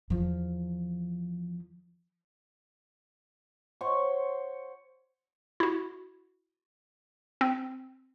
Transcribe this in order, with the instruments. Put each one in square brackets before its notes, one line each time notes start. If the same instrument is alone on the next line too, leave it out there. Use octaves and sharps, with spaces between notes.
[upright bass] E2 F3
[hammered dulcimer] C5 C#5 F#5 C#6
[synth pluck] E4 F#4
C4